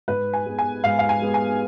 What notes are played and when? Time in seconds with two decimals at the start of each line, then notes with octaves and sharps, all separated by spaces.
0.08 G#2 B4
0.33 G#5
0.46 G#3 B3
0.59 G#5
0.84 G#2 F5
0.99 F5
1.09 G#5
1.22 G#3 B3
1.34 G#5